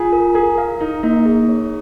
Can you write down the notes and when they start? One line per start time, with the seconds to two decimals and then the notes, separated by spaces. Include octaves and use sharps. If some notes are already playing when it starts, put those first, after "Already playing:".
Already playing: F4 G#4
0.13 A#4
0.35 G#4 A#4
0.58 F5
0.81 D#4 A#4
1.03 A#3 D#4
1.25 G#4
1.49 C#5